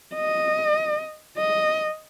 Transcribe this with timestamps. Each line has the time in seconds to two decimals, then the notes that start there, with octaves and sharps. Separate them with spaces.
0.15 D#5
1.37 D#5